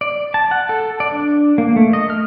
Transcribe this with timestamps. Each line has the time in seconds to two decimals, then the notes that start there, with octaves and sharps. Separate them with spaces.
0.01 D5
0.34 A5
0.51 F#5
0.69 A4
1.00 D5
1.12 D4
1.58 A#3
1.76 A3
1.93 D#5
2.10 F6